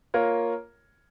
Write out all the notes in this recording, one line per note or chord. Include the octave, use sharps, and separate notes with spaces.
A#3 F4 A#4 C#5